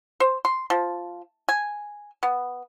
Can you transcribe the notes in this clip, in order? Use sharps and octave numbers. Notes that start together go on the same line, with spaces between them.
C5
C6
F3
G#5
B3